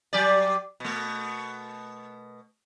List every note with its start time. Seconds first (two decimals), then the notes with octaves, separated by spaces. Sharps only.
0.13 F#3 G4 D5
0.80 B2 A3